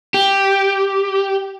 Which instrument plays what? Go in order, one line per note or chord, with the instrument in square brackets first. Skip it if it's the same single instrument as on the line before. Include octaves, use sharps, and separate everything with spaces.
[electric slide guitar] G4